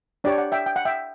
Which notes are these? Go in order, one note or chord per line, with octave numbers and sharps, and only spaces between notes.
D4 G4 C#5 D5
D5 F#5
E5 G5
G5
F#5
E5 G5